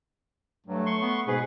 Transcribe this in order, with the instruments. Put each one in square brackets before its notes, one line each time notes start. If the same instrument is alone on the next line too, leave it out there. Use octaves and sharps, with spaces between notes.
[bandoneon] G2 [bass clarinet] F#3 [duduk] A3
[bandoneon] C6 C#6
[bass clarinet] B3
[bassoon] G#2 [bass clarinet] B2 [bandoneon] G#4 B4